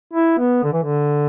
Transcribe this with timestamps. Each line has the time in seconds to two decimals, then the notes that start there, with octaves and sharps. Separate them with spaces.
0.14 E4
0.39 B3
0.64 D3
0.73 E3
0.83 D3